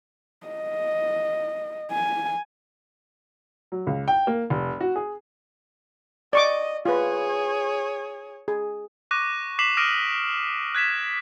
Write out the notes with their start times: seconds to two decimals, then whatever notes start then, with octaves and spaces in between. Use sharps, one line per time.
0.47 D#5
1.91 G#5
3.72 F#3
3.87 C#2
4.08 G5
4.27 A#3
4.50 F1
4.81 F#4
4.96 G#4
6.33 D5 D#5 C#6 D6
6.85 F4 G#4 B4 C#5
8.48 G#4
9.11 C#6 D6 F#6 A#6 D#7
9.59 D6 B6 C7 E7 F#7
9.77 D6 D#6 F6 A#6 D7 D#7
10.75 F#6 G#6 B6 E7